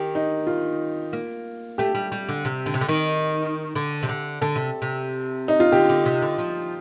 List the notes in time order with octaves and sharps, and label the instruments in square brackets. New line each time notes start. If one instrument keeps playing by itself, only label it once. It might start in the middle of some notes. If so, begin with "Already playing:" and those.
Already playing: [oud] D#3 [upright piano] G4
[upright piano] D#4
F4
[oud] A#3
[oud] A3 [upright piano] G4
[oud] G3
G3
D3
C3
D3
C3
D3
D#3
D3
C3
D3
[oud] D3 [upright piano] A4
[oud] C3
C3
[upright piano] D#4
F4
[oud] D3 [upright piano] G4
[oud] D3
C3
D3
F3